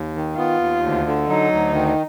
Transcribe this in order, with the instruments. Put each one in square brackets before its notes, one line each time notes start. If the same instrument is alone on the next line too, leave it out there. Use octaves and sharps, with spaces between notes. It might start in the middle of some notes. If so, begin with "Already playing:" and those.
Already playing: [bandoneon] D#2
D#3
[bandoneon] B3 [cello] F4
[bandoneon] D#2
D2
D3
[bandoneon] F#3 [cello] D#4
[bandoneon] D2
D#3